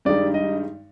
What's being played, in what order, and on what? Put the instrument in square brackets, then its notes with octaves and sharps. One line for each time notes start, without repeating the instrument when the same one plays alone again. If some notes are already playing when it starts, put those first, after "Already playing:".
[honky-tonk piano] G2 D#3 G#3 D#4 [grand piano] D5
[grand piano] D#5